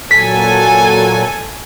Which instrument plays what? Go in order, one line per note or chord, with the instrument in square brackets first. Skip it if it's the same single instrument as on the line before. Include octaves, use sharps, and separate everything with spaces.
[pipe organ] A#2 F#3 [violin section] A4 G#5 [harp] B6